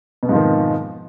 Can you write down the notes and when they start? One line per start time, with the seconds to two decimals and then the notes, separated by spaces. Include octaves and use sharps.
0.23 B2
0.26 F2
0.29 G#2
0.32 F3
0.35 D#3